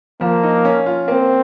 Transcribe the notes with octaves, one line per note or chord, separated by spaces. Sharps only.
F3 A#3
D#4
C#4
F4
A#3 C4